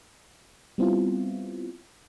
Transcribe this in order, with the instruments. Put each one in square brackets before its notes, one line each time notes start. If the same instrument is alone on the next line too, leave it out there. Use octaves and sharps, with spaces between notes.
[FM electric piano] G3 B3 C4 E4 F4